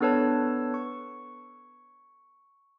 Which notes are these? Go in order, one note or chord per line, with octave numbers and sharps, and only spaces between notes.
B3 D4 A4 B4 C#5 A5
C#6